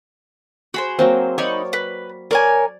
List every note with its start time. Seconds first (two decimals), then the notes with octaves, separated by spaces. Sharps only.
0.74 F#4 G#4 C5 B5
0.99 F#3 A#3 C4
1.38 D#4 C#5 D5 B5 C#6
1.73 B4
2.31 A#4 C#5 D5 G#5